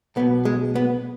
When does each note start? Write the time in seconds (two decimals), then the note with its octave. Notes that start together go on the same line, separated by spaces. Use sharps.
0.16 B1 B2 B3
0.45 G#3
0.75 B3